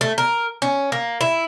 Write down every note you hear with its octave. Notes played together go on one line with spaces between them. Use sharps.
A3
A#4
C#4
A#3
E4